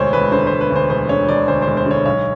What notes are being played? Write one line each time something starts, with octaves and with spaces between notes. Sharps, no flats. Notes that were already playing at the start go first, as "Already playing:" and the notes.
Already playing: E1 D2 C5 C#5
E1 B4
D3 C5
E1 C5
B4
D2
C5
E1 C5
D3 C#5
E1 D5
D2 C5
E1 C5
C5
D3 C#5
B1 C#5